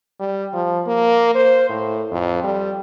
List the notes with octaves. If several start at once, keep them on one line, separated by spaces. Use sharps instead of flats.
G3
F3
A#3
C5
A2
F2
G3